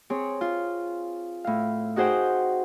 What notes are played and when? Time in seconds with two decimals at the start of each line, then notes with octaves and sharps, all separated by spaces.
0.10 C4 G#4 C#5
0.41 F4
1.45 A2 F5
1.96 D#4 F#4 G#4 C5 F#5 G5